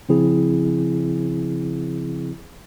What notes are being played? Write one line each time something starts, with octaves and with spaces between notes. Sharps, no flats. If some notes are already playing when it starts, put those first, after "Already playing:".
C#3 F3 C4 E4 G#4